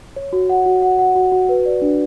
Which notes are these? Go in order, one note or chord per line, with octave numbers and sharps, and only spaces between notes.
C#5
F#4
F#5
F#4
F#5
F#5
F#4
F#4
B4
D5
D4